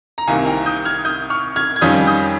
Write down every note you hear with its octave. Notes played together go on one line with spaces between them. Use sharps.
A#5
C2 C3 D#3 A#3 F5 G#5
G5 A#5
D#6 G6
F6 G#6
D#6 G6
C#6 F6
F6 G#6
G#6
F2 D#3 G3 C#4 F4 D#6 G6
D#6 G6